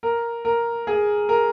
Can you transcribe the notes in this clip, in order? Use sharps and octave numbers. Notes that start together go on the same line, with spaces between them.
A#4
A#4
G#4
A#4